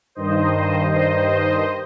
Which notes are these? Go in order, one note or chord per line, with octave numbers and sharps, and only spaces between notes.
G2 D#3 C5 D#5
C5 D#5